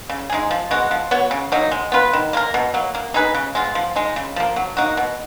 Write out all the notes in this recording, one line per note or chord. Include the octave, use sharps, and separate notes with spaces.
C#3
G#3 D#4 G#4
F3
G#3 B3 F#4
F3
B3 F#4 C#5
C#3
F#3 A#3 D#4
G#3
B3 F4 B4
D#3
A#3 F4 A#4
B2
F#3 A#3
A#3
D#4 G#4 B4
C#3
G#3 B3 F4
F3
G#3 D#4
C#3
F3 A#3
F#3
A#3 D#4 F#4
B2